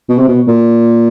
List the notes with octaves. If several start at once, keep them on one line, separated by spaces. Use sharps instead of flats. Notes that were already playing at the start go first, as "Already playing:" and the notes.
B2
C3
B2
A#2